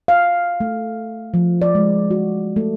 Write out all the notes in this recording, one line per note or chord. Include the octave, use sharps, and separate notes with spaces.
F5
A3
F3
D5
G#3
F#4
A3